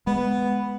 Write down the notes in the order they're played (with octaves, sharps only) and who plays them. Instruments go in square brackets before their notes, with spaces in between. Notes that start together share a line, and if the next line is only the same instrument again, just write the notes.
[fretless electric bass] G#3 [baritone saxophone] B3